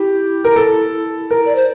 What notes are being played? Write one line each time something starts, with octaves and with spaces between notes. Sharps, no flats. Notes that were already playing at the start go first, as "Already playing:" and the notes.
Already playing: E4 G4
A#4
A4
A#4
D5
C5